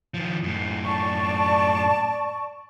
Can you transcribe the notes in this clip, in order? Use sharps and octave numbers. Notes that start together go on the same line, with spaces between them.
D#3 F3
F#2 A2
D5 A5 C#6